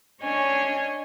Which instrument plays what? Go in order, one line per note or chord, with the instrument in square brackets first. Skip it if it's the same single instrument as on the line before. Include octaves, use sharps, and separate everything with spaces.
[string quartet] C#4 D4 C#5 D#5 G#5